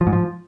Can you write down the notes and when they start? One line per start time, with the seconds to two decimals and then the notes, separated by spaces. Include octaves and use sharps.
0.01 F3
0.07 G#2
0.13 F3